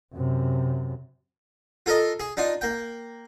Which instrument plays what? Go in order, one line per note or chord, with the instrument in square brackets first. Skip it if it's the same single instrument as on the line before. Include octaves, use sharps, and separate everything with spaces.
[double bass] F#2 C3
[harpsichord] F4 A4 A#4 D#5
G#4
D4 D#4 F4
A#3 G5